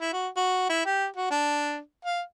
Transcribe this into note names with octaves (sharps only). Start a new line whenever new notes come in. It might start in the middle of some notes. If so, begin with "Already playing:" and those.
E4
F#4
F#4
E4
G4
F#4
D4
F5